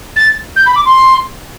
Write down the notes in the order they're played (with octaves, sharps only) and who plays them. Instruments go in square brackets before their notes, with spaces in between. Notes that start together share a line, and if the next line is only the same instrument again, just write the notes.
[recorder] A6
G6
B5
D6
C6